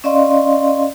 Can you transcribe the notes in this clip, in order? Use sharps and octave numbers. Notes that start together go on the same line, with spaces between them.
C#4 D5 D#5 F5 C6